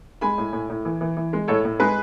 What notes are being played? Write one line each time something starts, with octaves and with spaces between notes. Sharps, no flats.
G#3 G#5 B5
A2
A2
A2
E3
E3
E3
G#3
A2 A4 C#5
A2
G#3 G#4 B4